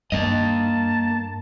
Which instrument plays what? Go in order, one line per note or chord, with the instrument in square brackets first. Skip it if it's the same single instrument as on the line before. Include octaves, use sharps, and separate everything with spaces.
[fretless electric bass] G2 [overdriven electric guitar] A#3 D#5 [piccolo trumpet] A5